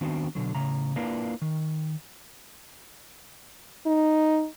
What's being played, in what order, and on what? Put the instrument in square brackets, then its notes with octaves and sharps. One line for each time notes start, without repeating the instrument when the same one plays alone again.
[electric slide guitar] D#3 B3 C4 D4 F#4
B2 D3 F#3
A2 C#3 A#5
A#3 D4 E4 F4 A#4 B4
D#3
[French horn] D#4